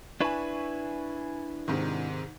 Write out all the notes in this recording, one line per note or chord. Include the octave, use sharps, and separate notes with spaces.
D4 E4 B4 G#5 C#6
G#2 C3 D#3